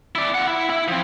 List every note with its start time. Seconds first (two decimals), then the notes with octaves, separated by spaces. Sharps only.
0.15 E4 D5
0.34 F4 F#5
0.47 E4
0.70 E4
0.88 F3 C4